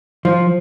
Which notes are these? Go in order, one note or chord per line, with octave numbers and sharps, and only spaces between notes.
F3